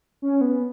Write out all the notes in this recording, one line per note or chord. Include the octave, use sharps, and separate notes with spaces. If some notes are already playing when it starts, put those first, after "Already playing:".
C#4
B3